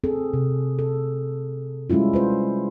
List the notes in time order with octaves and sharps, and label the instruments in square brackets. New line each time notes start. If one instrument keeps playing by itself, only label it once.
[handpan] C4 G#4 A4
C3
A4
G3 G#3 C#4 E4 F4
F4 B4 C5